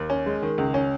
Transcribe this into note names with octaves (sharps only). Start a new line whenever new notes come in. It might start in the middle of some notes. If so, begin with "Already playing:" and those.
Already playing: D#2
C#4
G#3
D#3
C#2
C#4